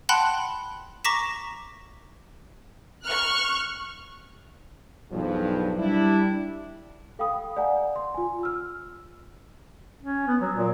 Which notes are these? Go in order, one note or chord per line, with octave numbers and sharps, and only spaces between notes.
F#5 G5 A5 B5 C6 F#6
A#5 C#6 D6 A#6 B6 E7
C#6 F6 F#6
B1 E2 G2 F3
G3 D4 E4
A4 F5 G5 B5 D#6
D5 F5 F#5 G#5 A#5
C6
F4 G#5
E6 F6
C#4
B3
F#3
A#2